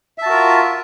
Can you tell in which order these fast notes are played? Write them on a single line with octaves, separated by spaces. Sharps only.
E5 A5 F#4 A#4 F4